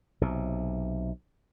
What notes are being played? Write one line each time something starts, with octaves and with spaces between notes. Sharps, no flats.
B1 C3